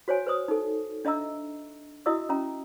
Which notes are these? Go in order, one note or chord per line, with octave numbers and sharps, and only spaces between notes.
F#4 C5 C#5 G#5
B4 C5 D#6
D#4 A4
D4 D#5 E5 A#5 E6
E4 F#4 D#5 E5 D#6 E6
C#4 E5 A#5